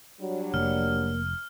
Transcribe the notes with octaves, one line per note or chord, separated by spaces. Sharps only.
F#3 G3 D4
F1 A#3 F6